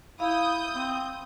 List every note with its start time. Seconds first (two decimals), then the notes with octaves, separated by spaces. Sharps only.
0.20 E4 F5 D#6 G6
0.75 C4